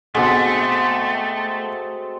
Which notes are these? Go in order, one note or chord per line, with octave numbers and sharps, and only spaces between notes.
B2 D3 G#3 A3 C4 F#4